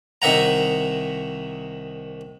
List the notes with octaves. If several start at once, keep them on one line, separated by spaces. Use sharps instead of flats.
C2 D#3 E5 F#5 A#5